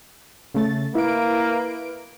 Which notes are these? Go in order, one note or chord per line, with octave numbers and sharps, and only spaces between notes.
C#3 A3 A6
A#3 E4 B4 D7